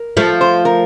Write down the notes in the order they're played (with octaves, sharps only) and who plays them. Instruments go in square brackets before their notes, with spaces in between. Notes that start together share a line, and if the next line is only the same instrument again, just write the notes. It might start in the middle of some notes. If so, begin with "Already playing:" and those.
Already playing: [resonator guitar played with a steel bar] A#4
[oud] F3 A3
[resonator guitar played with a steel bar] C5
A#4